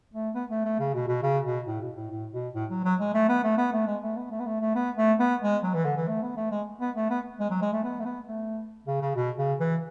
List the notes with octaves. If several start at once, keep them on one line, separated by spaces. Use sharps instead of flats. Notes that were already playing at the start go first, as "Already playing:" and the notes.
A3
B3
A3
A3
C#3
B2
B2
C#3
B2
A2
B2
A2
A2
B2
A2
F#3
F#3
G#3
A3
B3
A3
B3
A3
G#3
A3
B3
A3
B3
A3
A3
B3
A3
B3
G#3
F#3
E3
D3
E3
A3
B3
A3
G#3
B3
A3
B3
G#3
F#3
G#3
A3
B3
A3
B3
A3
C#3
C#3
B2
C#3
E3